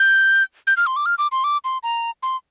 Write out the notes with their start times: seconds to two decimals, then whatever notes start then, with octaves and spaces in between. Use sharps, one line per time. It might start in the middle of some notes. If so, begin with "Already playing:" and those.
Already playing: G6
0.67 G6
0.77 F6
0.87 C6
0.96 D6
1.06 F6
1.18 D6
1.32 C6
1.44 D6
1.64 C6
1.83 A#5
2.23 C6